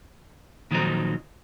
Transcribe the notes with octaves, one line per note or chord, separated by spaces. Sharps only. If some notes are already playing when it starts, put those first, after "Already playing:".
A#2 D#3 F3 F#3 C4 D#4